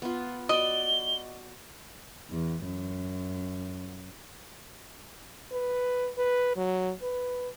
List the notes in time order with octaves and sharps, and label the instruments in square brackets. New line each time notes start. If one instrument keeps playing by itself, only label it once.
[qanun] B3 F4
[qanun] F#4 D5 [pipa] D#5 [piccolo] G7
[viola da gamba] E2
F#2
[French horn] B4
B4
F#3
B4